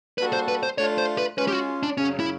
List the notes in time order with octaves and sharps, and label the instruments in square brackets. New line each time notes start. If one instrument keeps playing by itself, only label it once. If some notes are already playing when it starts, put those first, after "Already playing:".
[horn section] G3 A#3 D4 F#4 A4 [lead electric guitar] B4
[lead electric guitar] C5
B4
C5
[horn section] A3 D4 F4 [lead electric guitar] C#5
[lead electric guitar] C5
B4
[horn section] G#3 C#4 F4 [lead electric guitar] B4
[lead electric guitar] G4
F#4
D4
[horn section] F#2 C#3 F#3 [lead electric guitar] C#4
[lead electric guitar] E4